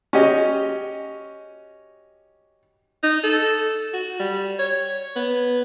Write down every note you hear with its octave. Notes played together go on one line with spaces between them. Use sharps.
C#4 F#4 G4 D#5
D#4
A4
F#4
G3
C#5
B3